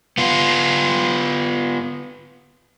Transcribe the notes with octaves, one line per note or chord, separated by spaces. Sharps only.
B3 F4